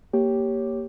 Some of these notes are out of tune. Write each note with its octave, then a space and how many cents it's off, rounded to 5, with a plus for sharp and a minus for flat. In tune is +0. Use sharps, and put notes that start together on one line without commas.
A#3 +0 G4 +0 C#5 +0